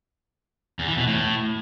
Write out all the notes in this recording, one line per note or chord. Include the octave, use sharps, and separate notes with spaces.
E2
E3
B2
A2